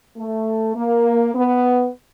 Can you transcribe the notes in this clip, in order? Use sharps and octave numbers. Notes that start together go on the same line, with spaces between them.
A3
A#3
B3